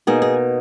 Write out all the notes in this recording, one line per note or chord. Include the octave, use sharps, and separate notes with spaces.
B2 A#3 D#4 G#4
G#4